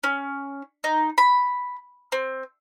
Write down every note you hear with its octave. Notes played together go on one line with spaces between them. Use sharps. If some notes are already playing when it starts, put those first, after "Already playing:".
C#4
D#4
B5
C4